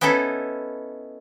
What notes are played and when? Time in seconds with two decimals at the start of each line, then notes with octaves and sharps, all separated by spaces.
0.01 B3 C#4 D#4 E4 A4